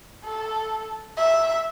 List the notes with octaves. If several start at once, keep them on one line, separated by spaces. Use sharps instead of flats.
A4
E5